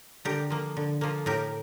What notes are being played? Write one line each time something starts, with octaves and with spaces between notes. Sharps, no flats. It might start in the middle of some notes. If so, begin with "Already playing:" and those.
D3 G4 A#4
F3 A#3
D3
F3 A#3
A2 G4 A#4